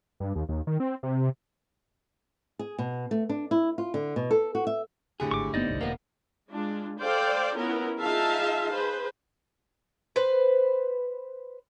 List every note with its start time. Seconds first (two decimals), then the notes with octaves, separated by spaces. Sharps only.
0.20 G2
0.35 D#2
0.49 D#2
0.67 D#3
0.80 C4
1.03 C3
2.59 G#4
2.78 B2
3.11 A3
3.29 D4
3.51 E4
3.78 F4
3.94 D3
4.16 B2
4.31 A4
4.55 F#4
4.67 E5
5.20 A2 D3 G4 G#4
5.31 G#1 C#6 D6
5.54 G1 A#3 B3 D#4 C5 D5 D#5
5.69 G1 C2
5.81 E1 A#3 B3
6.50 G#3 D4 F4
7.00 A4 C5 D5 F5 G5
7.57 B3 C#4 E4 F4 A#4
8.01 D#4 F4 G#4 E5 F5 A5
8.75 G#4 B4 C5
10.16 B4 C5